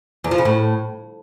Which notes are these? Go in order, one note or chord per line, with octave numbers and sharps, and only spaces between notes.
E2
F3
C#3
A2